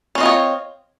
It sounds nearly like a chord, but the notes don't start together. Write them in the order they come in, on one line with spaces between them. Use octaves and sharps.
C#4 C4 D#5 F4 C#5